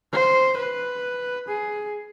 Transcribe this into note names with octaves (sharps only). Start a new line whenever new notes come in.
C5
B4
G#4